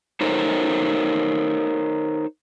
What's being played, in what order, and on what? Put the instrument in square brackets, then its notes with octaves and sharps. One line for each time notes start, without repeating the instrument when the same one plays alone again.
[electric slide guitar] D#4 A4 A#4 C5 C#5